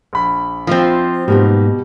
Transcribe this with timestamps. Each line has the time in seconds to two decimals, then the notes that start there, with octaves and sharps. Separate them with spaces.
0.13 A#1 B5
0.67 F3 C4 F4 D#5 E5
1.28 G#2 B2 G3 A#3 B3 D#4